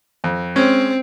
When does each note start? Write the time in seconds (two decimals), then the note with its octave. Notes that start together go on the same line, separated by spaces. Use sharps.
0.24 F2
0.56 G#3 C4 C#4